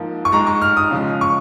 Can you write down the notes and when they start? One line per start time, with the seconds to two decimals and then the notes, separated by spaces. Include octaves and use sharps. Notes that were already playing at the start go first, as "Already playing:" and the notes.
Already playing: G#2 F3 A#3
0.25 C#6
0.32 G#2 G#3 A#5
0.47 C#6
0.61 F6
0.77 D#6
0.91 C#3 F3 G#3
1.21 C#6